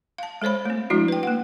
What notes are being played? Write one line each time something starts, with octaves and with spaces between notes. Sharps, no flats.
F5 A5
G#3 A4 C5 C#5 B5
A3 C4
F3 G#3 D4 E4 F#4
B4 G5
A#3 F#5